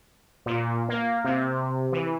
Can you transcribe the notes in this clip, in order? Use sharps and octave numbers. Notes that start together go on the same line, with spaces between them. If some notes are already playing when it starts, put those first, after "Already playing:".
A#2
A#3
C3
E3